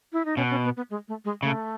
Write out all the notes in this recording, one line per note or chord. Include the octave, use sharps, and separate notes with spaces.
E4
D#4
B2 C#4
C#4
B3
B3
G#3
A3
G#3
C#3 A3